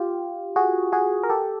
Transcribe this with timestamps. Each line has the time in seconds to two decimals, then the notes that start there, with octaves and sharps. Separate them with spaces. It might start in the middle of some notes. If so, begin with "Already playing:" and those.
Already playing: F4 G4
0.56 F#4 G#4
0.93 F#4 G#4
1.23 A#4
1.29 G4 A4